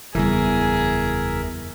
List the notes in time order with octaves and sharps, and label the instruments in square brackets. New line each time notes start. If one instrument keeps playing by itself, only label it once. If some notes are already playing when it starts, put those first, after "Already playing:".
[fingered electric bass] F#1 G3 [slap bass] E2 C#3 E3 [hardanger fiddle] G#4 [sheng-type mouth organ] A#4 E5